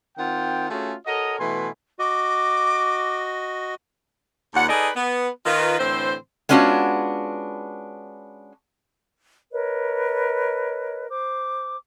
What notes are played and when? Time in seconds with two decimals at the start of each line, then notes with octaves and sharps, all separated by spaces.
0.17 D#3 C4 F4 F#5 G5
0.69 A3 C#4 F4 F#4 G#4
1.06 F#4 A4 A#4 C#5 D#5
1.39 B2 E3 A3 B4 G#5 C6
1.99 F#4 D#5 D6
4.54 D#2 A#2 F#5
4.69 D#4 G#4 A4 B4 D5 D#5
4.96 B3
5.45 D#3 F4 B4
5.79 A2 D3 E3 C4 C5
6.49 G#3 B3 C#4 D4 F4 F#4
9.51 A#4 B4 C#5 D#5
11.09 C5 D6